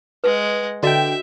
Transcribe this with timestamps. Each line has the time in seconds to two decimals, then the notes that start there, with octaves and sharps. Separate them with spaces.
0.24 G#3 B4 F#5
0.83 D3 F#4 D#5 E5 G5